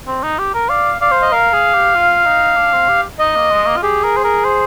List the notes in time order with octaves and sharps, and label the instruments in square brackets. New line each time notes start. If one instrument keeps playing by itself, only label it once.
[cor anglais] C4
D#4
G4
A#4
[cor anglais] D5 [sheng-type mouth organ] F5
[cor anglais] D5 [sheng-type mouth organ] F5
[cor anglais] C5
[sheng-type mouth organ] D#5
[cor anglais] A#4 [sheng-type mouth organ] F5
[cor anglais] G#4
G4
F4
D#4
D4
C4
G4
[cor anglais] D#4 [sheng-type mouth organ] D#5
[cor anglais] A#3
G#3
A#3
F4
[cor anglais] G4 [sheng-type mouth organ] G#4
[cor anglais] A#4
C5
A#4
C5